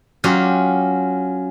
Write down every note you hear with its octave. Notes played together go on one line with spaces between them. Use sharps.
F#3 C#4 F4 G4